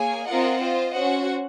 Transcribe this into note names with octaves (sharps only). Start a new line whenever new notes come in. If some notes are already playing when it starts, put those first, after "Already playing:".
Already playing: A#3 G#4 C#5 G#5
C4 F4 A#4 D#5 F#5
F4 C5 D#5
C#4 F#4 C5 F#5